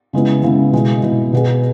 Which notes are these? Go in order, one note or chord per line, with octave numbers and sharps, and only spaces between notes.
C#3 G#3 B3 E4
C#3 G#3 B3 E4
B2 G#3 E4
B2 G#3 E4
B2 B3 G#4